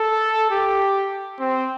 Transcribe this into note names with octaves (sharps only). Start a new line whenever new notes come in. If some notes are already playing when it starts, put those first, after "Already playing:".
Already playing: A4
G4
C4